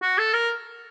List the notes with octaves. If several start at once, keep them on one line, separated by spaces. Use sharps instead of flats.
F#4
A4
A#4